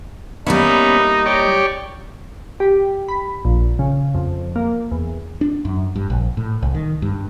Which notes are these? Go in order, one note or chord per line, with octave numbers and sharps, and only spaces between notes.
G3 A#3 B3 C#4 D#4 E4
G4 C#5 D5
G4
B5
A#1
C#3
F2
A#3
E2
D4
F#2
G2
A#1
A2
C2
D#3
G2